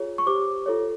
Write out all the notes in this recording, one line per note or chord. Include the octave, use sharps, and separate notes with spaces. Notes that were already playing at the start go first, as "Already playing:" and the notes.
Already playing: F4 G#4 C#5
C#6
G4 C5 D6
F4 A4 C#5